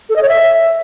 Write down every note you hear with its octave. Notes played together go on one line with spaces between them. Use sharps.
A4
D#5
C#5
E5